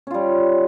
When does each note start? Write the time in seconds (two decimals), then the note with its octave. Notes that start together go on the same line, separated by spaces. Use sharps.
0.07 C#4
0.11 F4
0.14 G3